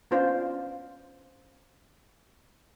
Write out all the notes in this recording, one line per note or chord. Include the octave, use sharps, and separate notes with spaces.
B3 C#4 D4 F4 C5